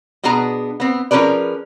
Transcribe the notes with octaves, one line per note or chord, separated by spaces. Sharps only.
B2 B3 D4 G#4 A#5
B3 C4
F3 C#4 G#4 A#4 B4 D5